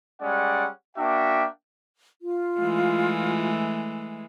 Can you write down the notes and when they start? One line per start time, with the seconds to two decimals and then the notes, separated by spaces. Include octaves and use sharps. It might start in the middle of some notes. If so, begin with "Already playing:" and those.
0.21 G3 G#3 C#4 D5 F#5
0.97 A#3 D4 F#4 E5 G5
2.21 F4
2.58 E3 G#3 A3